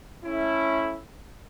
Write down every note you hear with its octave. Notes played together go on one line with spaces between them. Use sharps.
A3 C#4 E4